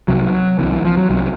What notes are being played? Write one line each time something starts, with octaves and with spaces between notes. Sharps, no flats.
C2 C3 F#3
C2 C3 E3
E3
F3
F#3
C2 C3 F#3